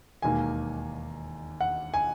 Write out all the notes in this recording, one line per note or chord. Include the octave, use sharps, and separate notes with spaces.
E1 D#2 D#3 A#3 G#5
F#5
G#5